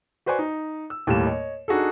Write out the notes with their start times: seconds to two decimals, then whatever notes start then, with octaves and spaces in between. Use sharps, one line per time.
0.26 F#4 B4 C5 D5 G#5 C#6
0.39 D#4
0.90 E6
1.07 D#2 A2 G3 A#3 E7
1.26 C#5 D#5
1.68 D4 D#4 F#4 G#4 A4